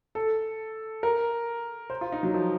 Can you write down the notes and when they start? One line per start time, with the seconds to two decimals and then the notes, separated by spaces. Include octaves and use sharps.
0.15 A4
1.03 A#4
1.90 C5
2.01 F4
2.12 D#4
2.23 F#3
2.34 F3